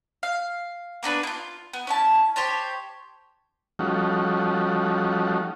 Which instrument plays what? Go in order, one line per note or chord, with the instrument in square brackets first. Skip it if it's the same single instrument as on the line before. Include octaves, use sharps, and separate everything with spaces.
[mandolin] F5
A#3 B3 D4 B4
E4 F4
B3
C#4 E4 A5
G4 C5 C#5 A5
[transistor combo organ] F3 G3 A3 C#4 D#4 F#4